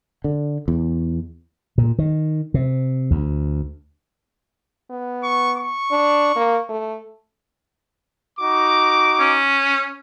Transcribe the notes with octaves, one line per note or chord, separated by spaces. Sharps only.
D3
E2
A#2
D#3
C3
D2
B3
C#6
C#6
D4
A#3
A3
D#4 F#4 D6
C#4